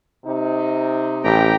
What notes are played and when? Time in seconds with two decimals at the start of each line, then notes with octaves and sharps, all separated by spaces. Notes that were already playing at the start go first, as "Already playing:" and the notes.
0.25 C3 D#4
1.24 A1 G4 G5 A#5